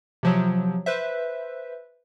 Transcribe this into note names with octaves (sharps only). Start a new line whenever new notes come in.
C3 F3 F#3
B4 C5 E5